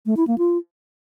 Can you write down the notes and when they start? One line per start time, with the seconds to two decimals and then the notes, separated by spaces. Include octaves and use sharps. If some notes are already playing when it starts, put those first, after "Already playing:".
0.06 A3
0.17 E4
0.27 A#3
0.38 F4